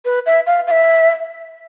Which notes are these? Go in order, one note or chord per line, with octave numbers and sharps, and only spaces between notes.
B4
E5
F5
F5
E5